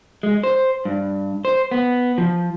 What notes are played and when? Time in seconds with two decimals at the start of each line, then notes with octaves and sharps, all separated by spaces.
0.23 G#3
0.44 C5
0.85 G2
1.45 C5
1.71 B3
2.18 F3